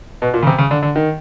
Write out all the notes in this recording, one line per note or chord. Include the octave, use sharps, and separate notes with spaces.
B2
A#2
C#3
C3
C#3
D3
D3
D#3